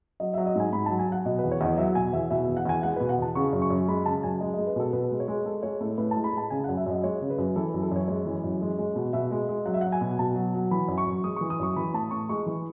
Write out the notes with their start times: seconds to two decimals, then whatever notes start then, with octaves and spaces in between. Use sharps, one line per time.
0.20 F#3 D#5
0.34 F#3 E5
0.46 D#5
0.56 G#2 G#5
0.73 G#2 B5
0.86 F#3 A5
0.99 G#5
1.08 F#3 F#5
1.25 B2 D#5
1.39 E2 B4
1.52 C#5
1.61 E2 D#5
1.78 F#3 E5
1.95 B2 G#5
2.13 E2 E5
2.30 B2 E5
2.44 E2 E5
2.57 F#5
2.66 E2 G#5
2.83 G#3 F#5
2.96 B2 B4
3.09 F#5
3.18 E2 A5
3.35 C#3 C#6
3.53 F#2
3.62 C#6
3.70 F#2
3.88 G#3 B5
4.06 C#3 A5
4.23 F#2 G#5
4.41 G#3 D#5
4.54 G#3 D#5
4.67 B4
4.76 B2 A4
4.93 B2 B4
5.11 G#3
5.20 C#5
5.28 G#3
5.45 G#3 A4
5.63 G#3 C#5
5.80 A2 A4
5.98 A2 B4
6.11 A5
6.16 G#3
6.24 B5
6.33 G#3 A5
6.50 C#3 G#5
6.64 F#2 F#5
6.77 E5
6.86 F#2 D#5
7.03 G#3 C#5
7.21 C#3
7.30 B4
7.38 F#2
7.56 E3 A4
7.69 F#2 B4
7.82 A4
7.91 F#2 C#5
8.08 G#3 C#5
8.26 E3
8.44 F#2
8.62 G#3
8.78 G#3
8.96 B2
9.13 B2 E5
9.31 G#3
9.49 G#3
9.66 F#3 F#5
9.74 E5
9.81 F#3 F#5
9.92 G#5
10.01 B2
10.19 B2 A5
10.36 F#3
10.54 F#3
10.71 E3 B5
10.88 F#2
10.98 C#6
11.06 F#2
11.24 G#3 D#6
11.36 E3 C#6
11.50 D#6
11.59 F#2 C#6
11.76 E3 B5
11.94 A2 A5
12.11 A2 C#6
12.29 G#3 C#6
12.46 E3